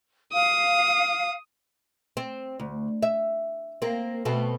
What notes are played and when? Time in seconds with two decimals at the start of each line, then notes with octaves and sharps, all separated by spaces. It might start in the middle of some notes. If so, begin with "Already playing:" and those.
0.34 F5 D#6
2.17 C4
2.60 D2
3.03 E5
3.82 A#3 C4
4.25 B2 A3 C4